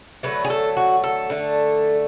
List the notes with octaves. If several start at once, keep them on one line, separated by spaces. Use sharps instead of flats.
D3 F#3 A3 B4
G#4
A4
F#4
A4
D3 A3